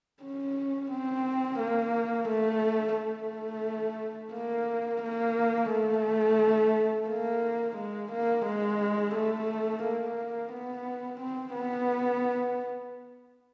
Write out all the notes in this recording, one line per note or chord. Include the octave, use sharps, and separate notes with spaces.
C#4
C4
A#3
A3
A3
A#3
A#3
A3
A#3
G#3
A#3
G#3
A3
A#3
B3
C4
B3